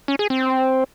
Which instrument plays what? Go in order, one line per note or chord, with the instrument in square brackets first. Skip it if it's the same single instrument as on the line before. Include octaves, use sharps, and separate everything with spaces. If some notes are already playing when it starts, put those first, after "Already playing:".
[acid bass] C#4
G#4
C4